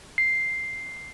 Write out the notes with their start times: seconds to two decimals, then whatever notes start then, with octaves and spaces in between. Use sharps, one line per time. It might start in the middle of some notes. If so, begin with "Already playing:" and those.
0.18 C7